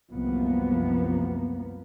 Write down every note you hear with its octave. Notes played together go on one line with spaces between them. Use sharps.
C2 F#2 F3 A#3 B3